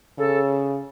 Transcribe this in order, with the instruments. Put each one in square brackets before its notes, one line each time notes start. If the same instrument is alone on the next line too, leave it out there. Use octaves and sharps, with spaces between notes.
[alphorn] C#3 [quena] A4